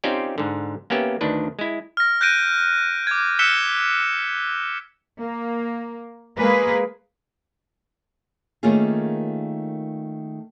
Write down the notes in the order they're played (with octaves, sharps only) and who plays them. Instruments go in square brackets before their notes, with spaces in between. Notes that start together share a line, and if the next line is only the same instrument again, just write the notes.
[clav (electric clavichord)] C4 C#4 D#4 F4 G4 D5
G#2 D3
A#3 B3 C#4 G4 E5
D2 D#3 D4 B4
G#3 E4
[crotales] F6 A#6
F#6 G6 A#6 D7 D#7
D6 G#6
E6 F#6 B6 C#7 E7 G7
[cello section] A#3
G#3 A#3 G#4 B4
[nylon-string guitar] D#3 A3 A#3 C#4 F4 G#4